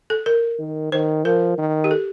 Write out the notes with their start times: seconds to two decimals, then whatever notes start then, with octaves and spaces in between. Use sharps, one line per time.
0.10 A4
0.26 A#4
0.59 D#3
0.92 D#3 C5
1.25 F3 A#4
1.58 D#3
1.84 G4
1.91 A4